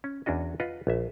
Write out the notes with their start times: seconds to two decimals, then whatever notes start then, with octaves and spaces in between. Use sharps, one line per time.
0.04 C#4
0.26 E2 C#4 D4 F#4 D#5
0.60 F4 B4 D#5 F#5
0.87 A#1 E5